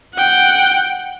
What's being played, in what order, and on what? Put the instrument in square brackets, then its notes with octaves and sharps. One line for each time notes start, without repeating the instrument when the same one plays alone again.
[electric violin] F#5 G5